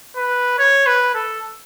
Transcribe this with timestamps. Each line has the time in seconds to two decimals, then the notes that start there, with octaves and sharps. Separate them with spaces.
0.16 B4
0.59 C#5
0.87 B4
1.15 A4